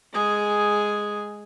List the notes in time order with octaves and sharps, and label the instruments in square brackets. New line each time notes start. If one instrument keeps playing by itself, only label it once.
[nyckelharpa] G#3 G#4